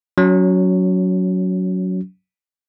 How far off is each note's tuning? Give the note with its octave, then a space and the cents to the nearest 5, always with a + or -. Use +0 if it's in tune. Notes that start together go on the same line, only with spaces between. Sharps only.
F#3 +0 C#4 +25